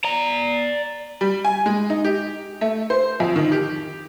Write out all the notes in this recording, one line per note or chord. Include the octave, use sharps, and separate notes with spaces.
D5 A#5
G3
G#5
G#3
D#4
G4
A3
C5
F2
D#3
G4